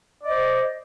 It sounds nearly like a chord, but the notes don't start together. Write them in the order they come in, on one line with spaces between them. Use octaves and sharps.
D5 D#5 C5